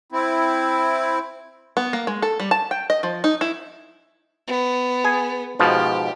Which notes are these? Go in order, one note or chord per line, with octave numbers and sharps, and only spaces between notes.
C4 E4
B3
A#3
G#3
A4
G3
A5
G5
D#5
F3
D#4
E4
B3
G#4 G#5
G#2 B2 F3 G4